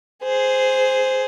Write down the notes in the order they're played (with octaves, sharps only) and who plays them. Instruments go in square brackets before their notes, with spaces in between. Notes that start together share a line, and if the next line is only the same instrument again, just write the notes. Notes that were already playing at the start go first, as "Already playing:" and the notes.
[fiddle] G#4 C5